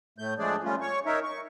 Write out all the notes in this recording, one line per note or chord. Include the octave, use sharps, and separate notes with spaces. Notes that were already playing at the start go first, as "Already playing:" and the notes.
A2 A3 G6
F3 G#3 A3 D4 G#4 D5
G3 A3 C#4 F4
C#5 C#6
D#4 A#4 C#5 E5
C#6